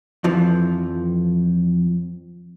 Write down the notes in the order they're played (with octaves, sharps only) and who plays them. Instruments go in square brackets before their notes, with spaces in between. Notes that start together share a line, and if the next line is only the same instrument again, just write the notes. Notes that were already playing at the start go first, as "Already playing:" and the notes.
[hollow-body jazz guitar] F2 E3 F3